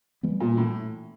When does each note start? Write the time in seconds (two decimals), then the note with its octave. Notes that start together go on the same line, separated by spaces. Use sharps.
0.23 E3 G3 B3
0.40 A#2
0.57 A2